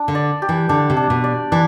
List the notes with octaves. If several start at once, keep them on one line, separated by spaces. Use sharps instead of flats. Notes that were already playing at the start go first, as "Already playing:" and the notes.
Already playing: D4
D3
D5
G4
E3
D3 D4
C3
D4
B2
D5
E3 D4